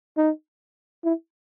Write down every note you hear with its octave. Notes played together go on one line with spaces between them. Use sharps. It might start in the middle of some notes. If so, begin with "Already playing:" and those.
D#4
E4